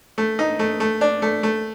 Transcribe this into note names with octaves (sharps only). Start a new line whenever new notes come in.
A3
D#4
A3
A3
D4
A3
A3